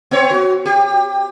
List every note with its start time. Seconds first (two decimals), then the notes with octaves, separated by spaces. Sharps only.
0.11 B3 C4 C#5
0.31 F#4
0.65 G4